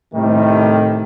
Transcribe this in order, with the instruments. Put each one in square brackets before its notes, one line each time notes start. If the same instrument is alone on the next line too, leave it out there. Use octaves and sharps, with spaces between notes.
[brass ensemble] A2 C3 D#3 G3 A3